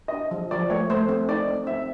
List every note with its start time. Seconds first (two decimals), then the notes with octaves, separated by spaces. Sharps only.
0.08 D#5
0.13 D4
0.31 F3
0.51 F3 D5
0.70 A3 C#5
0.90 A3 C5
1.09 C4
1.29 D#4 D5
1.48 C4
1.67 C4 E5